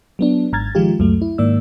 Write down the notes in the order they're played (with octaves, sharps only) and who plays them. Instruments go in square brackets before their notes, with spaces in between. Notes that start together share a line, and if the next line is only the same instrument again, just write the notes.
[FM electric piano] F#3 B3 D4
G#1 G#2 A#5 F6 G#6 A6
D#3 F3 G#3 F4 G4
C#2 F#2 F#3 A3
E4
G#2 D#3 A#3 D5 E6